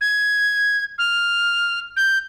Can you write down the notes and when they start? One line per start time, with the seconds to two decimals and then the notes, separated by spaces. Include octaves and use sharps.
0.01 G#6
0.98 F6
1.97 G6